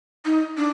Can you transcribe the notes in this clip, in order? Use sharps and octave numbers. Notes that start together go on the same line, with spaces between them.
D#4
D4